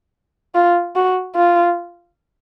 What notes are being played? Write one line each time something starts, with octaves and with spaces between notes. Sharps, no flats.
F4
F#4
F4